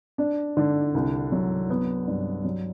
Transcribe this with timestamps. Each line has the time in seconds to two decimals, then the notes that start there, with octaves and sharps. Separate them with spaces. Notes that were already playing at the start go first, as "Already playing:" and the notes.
0.18 D4
0.57 D3
0.95 C2
1.32 F#3
1.70 B3
2.07 G2
2.44 F#3